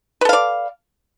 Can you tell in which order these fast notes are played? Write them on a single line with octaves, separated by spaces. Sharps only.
B4 A4 F5 D5